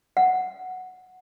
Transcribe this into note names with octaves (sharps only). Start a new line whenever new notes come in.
F#5